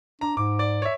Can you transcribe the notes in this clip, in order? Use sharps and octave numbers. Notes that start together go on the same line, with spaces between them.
D4 A#5
G#2 D6
D5
C#5 E5